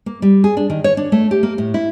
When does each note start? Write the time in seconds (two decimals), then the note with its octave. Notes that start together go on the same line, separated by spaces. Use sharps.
0.06 A#3
0.22 G3
0.44 G#4
0.57 D4
0.70 D#3
0.84 C#5
0.97 D4
1.12 A3
1.31 G4
1.43 A#3
1.58 A2
1.74 E4